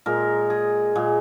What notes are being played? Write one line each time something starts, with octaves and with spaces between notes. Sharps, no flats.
A#2 G#3 A#4
G#4
A#2 G#3